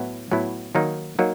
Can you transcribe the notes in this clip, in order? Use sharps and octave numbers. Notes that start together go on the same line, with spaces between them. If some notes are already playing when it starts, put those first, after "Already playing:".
Already playing: A2 F#3 B3 E4
A2 F#3 B3 E4
D#3 F#3 A#3 D#4
F#3 A#3 D#4